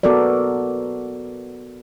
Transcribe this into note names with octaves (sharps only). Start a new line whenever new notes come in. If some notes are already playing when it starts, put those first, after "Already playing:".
B3 F#4 A4 A#4 D5